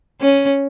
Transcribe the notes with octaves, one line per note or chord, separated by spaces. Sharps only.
C#4